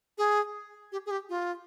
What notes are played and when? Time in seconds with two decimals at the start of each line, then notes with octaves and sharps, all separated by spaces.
0.18 G#4
0.92 G4
1.06 G#4
1.11 G4
1.29 F4